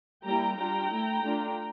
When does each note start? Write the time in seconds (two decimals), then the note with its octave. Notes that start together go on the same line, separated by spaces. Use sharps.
0.25 G3 A#3 E4 G5 A#5
0.57 G3 D4 F4 G5 A#5
0.90 A3 E4
1.22 A3 D4 F4